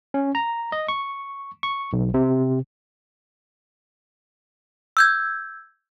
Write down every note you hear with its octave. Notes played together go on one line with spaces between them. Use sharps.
C#4
A#5
D#5
C#6
C#6
B1
C3
E6 G6 G#6